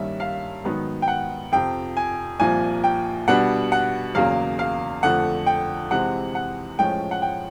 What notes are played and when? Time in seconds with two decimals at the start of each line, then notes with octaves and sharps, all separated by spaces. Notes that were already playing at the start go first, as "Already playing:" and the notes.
Already playing: G2 D#3 G3 A#3 C#4 E5
0.20 F5
0.64 G#2 D#3 F#3 B3
1.02 G5
1.08 F#5
1.52 F2 C3 F3 G5
1.97 G#5
2.39 C2 A#2 F3 G#5
2.84 G5
3.28 B2 G3 B3 D4 F#5
3.72 F#5
4.15 E2 C#3 F#3 A#3 F5
4.59 F5
5.03 F2 D3 F3 A3 F#5
5.46 G5
5.91 C3 E3 G#3 C4 F#5
6.35 F#5
6.79 A2 F3 G#3 C#4 G5
7.11 F#5
7.22 G5